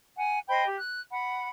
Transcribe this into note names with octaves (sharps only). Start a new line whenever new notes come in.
F#5 G#5
C5 D#5 G5 B5
G4
F#6
F#5 B5